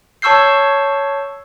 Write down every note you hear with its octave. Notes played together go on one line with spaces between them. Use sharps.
C#5 A5 C#6 E6 G6 C7